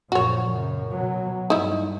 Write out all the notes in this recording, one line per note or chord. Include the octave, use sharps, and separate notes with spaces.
A#1 F#2 F3 F#4 C#5
F#2 C#3
B2 F#3
G2 D#4 E4